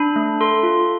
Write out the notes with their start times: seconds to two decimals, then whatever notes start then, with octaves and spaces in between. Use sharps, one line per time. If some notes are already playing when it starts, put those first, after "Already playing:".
Already playing: D4 B5
0.16 A3
0.41 A4 C6
0.63 F4